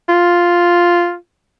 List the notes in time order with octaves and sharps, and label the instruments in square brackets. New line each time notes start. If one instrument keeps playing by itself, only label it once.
[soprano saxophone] F4